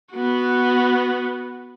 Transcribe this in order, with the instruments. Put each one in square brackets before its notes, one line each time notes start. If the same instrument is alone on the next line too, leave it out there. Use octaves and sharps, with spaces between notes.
[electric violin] B3 F#4